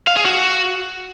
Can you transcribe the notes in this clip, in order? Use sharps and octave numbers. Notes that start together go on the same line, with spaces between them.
F5
G#4
F#4